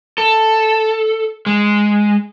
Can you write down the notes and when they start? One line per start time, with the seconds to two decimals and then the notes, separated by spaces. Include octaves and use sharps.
0.18 A4
1.46 G#3